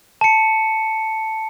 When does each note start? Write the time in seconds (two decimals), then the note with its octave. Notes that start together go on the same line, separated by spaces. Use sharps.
0.21 A5 C#7